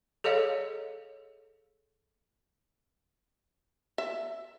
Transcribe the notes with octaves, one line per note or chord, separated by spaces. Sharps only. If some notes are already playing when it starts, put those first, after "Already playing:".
G#4 A4 C#5 D#5 F5
E5